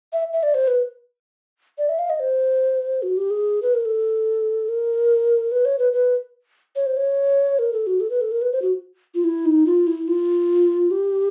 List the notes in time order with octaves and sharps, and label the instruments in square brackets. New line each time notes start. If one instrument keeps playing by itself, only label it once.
[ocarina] E5
E5
D5
C5
B4
D5
E5
F5
D#5
C5
F#4
G4
G#4
B4
A#4
A4
A#4
B4
C#5
B4
B4
C#5
C5
C#5
A#4
A4
F#4
A4
B4
A4
A#4
B4
C5
F#4
F4
E4
D#4
F4
E4
F4
G4